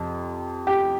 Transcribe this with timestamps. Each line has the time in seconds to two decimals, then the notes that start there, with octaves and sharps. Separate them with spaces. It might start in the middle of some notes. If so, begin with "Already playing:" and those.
Already playing: F2 C3
0.67 G4